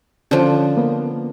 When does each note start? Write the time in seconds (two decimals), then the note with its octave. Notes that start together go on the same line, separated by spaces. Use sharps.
0.31 D3 F3 C#4
0.77 A#3 B3